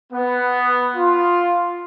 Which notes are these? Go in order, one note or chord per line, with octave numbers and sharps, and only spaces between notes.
B3
F4